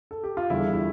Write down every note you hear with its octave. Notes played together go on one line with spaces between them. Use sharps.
A4
G4
F4
E2 D3 G3 E4
E4